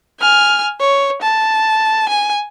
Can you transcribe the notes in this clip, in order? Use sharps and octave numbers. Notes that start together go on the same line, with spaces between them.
G#5 F6
C#5
A5
G#5